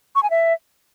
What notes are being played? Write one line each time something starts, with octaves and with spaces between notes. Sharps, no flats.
C#6
G#5
E5